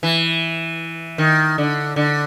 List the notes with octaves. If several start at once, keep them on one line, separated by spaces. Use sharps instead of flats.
E3
D#3
D3
D3